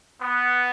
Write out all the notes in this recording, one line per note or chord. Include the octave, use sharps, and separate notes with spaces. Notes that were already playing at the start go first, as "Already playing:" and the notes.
B3